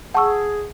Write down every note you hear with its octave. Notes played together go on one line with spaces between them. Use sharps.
G#4 F#5 A5 C#6 E6